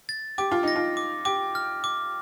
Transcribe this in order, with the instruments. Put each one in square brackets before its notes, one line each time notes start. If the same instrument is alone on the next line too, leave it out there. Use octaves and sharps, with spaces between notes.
[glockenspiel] A6
[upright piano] G4 [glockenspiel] D6
[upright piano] F4
[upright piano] D#4 [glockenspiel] A#6
[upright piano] F4
[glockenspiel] D6
[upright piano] G4 [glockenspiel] D6
[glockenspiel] F6
D6